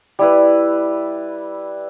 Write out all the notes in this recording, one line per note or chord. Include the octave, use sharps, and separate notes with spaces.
G3 E4 B4